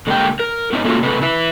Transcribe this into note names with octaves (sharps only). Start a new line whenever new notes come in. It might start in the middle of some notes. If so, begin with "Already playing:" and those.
D3 G#3 A#3 G4 A#4 G5
A#4
B3 C#4 D#4 E4
A3 A#3 C#4 F4 F#4
C3 A3 B3 B4
E4 B4 E5